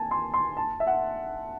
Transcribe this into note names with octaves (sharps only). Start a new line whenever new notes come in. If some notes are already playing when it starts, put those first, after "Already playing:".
Already playing: G#5 A5
C6
C6
A5
E5
F#5